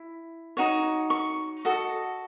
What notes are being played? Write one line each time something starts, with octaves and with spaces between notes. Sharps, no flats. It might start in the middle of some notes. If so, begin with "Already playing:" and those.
Already playing: E4
D#4 F#4 C#5
C#6
F#4 A4 D#5